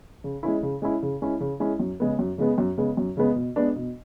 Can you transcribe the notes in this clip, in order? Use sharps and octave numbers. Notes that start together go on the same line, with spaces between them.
C#3
G#3 C#4 E4
C#3
G#3 C#4 E4
C#3
G#3 C#4 E4
C#3
G#3 C#4 E4
F#2
C#3 G#3 B3
F#2
C#3 G#3 B3
F#2
C#3 G#3 B3
F#2
C#3 G#3 B3
B2
G#3 B3 D4
B2